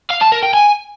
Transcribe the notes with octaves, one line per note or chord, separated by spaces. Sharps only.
F5
A5
A#4
G5
G#5